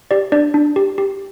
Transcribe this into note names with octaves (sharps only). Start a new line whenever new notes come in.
G4 D5
D4 D5
D4
G4
G4